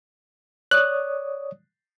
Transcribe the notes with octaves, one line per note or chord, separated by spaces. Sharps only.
C#5 D5 D#6 F#6